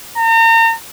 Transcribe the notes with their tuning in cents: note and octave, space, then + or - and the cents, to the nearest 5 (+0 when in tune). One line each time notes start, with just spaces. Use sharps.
A#5 -40